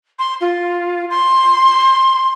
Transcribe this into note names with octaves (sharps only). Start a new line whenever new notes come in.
C6
F4
C6